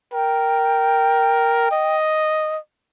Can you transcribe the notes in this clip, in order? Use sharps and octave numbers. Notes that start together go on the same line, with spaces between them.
A#4 G5
D#5